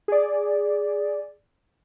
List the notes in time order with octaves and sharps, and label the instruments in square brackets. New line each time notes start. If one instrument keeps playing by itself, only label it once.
[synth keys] G#4 D5